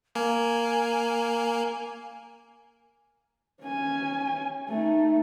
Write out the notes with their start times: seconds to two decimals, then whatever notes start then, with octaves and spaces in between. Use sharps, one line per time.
0.15 A#3 G#5
3.62 C#4 G#5
4.68 A3 D#4